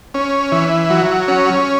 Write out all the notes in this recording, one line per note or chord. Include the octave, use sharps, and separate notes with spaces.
C#4
E3
F#3
C#4